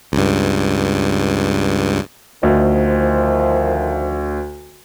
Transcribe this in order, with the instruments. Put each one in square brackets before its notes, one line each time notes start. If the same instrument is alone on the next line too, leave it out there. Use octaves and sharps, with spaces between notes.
[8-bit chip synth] C#2 G2
[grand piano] D2 [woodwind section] D#3 F3